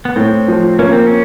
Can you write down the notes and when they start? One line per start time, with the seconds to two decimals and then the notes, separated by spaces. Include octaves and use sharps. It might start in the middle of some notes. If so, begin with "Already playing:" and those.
0.05 B3
0.16 A2 C4
0.48 F3
0.79 A#3 C#4
0.92 C4
1.07 C#4